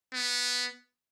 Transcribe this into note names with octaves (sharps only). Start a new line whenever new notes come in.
B3